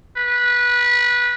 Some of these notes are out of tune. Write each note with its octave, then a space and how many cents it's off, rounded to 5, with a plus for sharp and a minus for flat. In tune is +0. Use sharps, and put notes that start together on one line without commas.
B4 -20